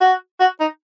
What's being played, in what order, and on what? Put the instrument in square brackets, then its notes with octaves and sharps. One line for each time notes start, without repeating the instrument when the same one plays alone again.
[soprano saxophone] F#4
F#4
D#4